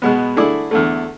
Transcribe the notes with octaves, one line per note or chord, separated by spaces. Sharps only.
B2 G#3 B3
D3 A3 E4 G#4 D5
E2 D3 A3